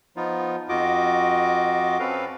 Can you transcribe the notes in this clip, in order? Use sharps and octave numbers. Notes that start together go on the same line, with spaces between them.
F3 B3 D#4 F4
F2 F4 F#4 D#5 D6
C4 C#4 A4 B4 F5